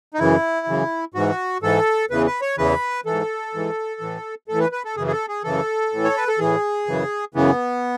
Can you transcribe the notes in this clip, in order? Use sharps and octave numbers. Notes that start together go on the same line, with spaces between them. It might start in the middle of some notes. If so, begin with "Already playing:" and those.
D#4
F#2 C#3 E3 E4
F#2 C#3 E3
G#2 E3 F#4
G#2 E3 A4
E2 C#3 E3 B4
B4
C#5
E2 C#3 E3 B4
G#2 E3 A4
G#2 E3
A2 E3
A2 E3 A4
B4
B4
A4
F#2 C#3 E3 G#4
G#4
A4
G#4
F#2 C#3 E3 A4
A2 E3
C#5
B4
A4
A2 E3 G#4
F#2 C#3 E3
F#2 C#3 E3 B3